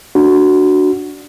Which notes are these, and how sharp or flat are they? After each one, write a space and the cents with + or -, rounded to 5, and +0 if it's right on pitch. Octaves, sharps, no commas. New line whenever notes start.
D4 +0 F#4 +0